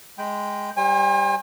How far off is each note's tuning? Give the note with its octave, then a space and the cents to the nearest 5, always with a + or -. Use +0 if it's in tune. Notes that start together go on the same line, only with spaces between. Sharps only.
G#3 +0 G5 +0 B5 +20
G3 +0 C5 +35 G#5 -40